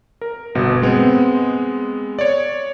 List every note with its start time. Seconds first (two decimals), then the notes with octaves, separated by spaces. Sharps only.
0.21 A#4
0.55 G1 B2 D#5
0.82 G#3 B3 C4
2.19 C#5 D5